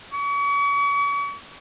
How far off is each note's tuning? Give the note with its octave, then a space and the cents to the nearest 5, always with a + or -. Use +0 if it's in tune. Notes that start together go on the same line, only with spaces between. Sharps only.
C#6 +40